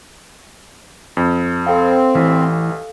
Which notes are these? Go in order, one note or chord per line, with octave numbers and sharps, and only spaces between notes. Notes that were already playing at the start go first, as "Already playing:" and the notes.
F2
C4 A4 F5
A1 E3